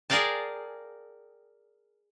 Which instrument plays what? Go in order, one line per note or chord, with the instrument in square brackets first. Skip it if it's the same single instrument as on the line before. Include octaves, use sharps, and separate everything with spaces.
[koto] G#4 A#4 D5 F5 G5 A5